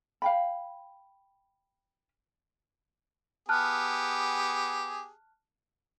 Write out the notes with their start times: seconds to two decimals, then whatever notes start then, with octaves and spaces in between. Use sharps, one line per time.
0.22 F5 G5 B5
3.49 B3 G4 G#4 A5 F6 F#6